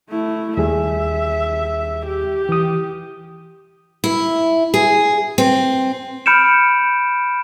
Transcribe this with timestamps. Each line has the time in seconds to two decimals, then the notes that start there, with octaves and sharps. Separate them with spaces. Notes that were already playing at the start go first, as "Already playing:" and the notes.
0.10 A3 E4
0.57 D#2 G3 G#4 E5
2.06 G4
2.49 E3 D#6
4.04 E4
4.74 G#4
5.38 C4
6.26 B5 F6 G6 C#7 D7 E7